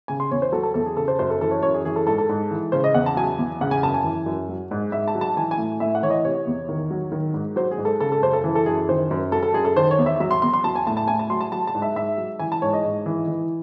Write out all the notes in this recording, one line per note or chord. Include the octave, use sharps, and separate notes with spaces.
C#3 G#5
C6
E2 C#5
C5
F#3 A4
A4
E2 A4
G#4
C#3 A4
C5
F#2 C5
A4
E3 A4
C#5
F#2 C#5
G#4
E3 G#4
A4
G#2 A4
A4
G#2
E3
C#3 C5
D#5
E2 F#5
A5
F#3 G#5
E2
C#3 F#5
G#5
F#2 A5
G#5
E3
F#2
F#3
G#2
G#2 E5
A5
F#3
A5
E3 G#5
G#5
A2
A2 E5
F#5
E3 C#5
D#5
C3 C#5
E2
D#3
F#3
D#3
G#2
F#3 C5
G#4
G#2
A4
C#3 A4
A4
F#2 C5
A4
E3
A4
F#2 G#4
D#3 C5
F#2
F#3 A4
A4
F#2 G#4
A4
D#3 C5
C#5
E2
E5
F#3 E5
C6
E2 C6
C6
F#3 A5
G#5
A2 A5
A5
A2 G#5
A5
F#3 C6
A5
F#3 A5
A5
G#2
E5
G#2 E5
F#3
E3 G#5
A5
G#2 C#5
D#5
G#2
E3
E3